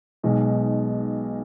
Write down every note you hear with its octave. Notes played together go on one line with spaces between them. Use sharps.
B1 B2 G#3 D#4